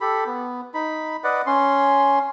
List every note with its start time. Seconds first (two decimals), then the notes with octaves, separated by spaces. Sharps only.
0.01 G4 A4 B5
0.26 B3
0.74 D#4 B5
1.24 B4 D5 D#5 F#5
1.47 C#4 C6